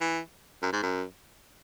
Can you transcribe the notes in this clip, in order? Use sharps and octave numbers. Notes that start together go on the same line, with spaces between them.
E3
F#2
G#2
F#2